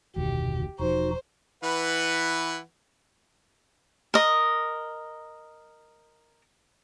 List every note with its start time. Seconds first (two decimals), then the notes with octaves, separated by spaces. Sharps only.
0.16 F1 D2 B2 D#3 G4
0.79 E1 F3 D#4 F#4 C5
1.63 E3 B4 F#5
4.14 A#4 D#5